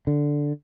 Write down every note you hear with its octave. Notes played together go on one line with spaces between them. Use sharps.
D3